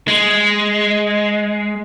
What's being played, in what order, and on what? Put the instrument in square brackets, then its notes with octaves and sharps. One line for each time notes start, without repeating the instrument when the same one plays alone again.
[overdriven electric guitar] G#3